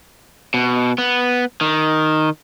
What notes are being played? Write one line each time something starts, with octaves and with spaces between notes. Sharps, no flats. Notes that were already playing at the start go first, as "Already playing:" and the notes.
B2
B3
D#3